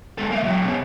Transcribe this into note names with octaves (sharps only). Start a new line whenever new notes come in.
G#3 A4
A#3 E5
F#3 G#3
B2 C#4